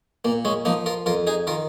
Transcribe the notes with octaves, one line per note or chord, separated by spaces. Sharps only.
A#2 A#3
G#3 C#4
F3 A#3 D#4
F4 A#4
F2 F4 A#4
D#4 G#4
D#3 F4 A#4